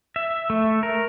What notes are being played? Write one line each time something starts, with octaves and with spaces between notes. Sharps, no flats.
E5
A3
A#4